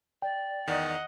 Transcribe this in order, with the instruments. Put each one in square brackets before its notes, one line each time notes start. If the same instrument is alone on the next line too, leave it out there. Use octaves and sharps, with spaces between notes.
[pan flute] D5 [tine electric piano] G5
[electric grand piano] E2 D#3 [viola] D#5 F#5